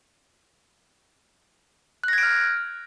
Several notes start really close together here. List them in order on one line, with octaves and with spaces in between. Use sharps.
F#6 A#6 G#6 D7 F6